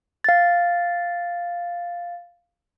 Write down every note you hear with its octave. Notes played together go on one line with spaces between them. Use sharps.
F5 A6